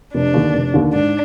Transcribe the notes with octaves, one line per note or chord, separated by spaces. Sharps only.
F1 D4
D#2 D3
F1
D#2 D3
G#2 D4